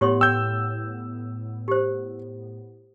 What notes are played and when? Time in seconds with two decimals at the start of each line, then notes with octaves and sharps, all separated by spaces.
0.01 A2 B3 G4 C#5 C6
0.21 G5 E6 G6
1.68 G4 C5